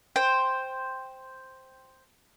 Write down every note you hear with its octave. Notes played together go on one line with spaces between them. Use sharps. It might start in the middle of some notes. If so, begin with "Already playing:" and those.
C5 G5